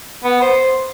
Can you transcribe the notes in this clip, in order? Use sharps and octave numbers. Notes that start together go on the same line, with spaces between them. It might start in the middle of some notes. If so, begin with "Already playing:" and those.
B3
C5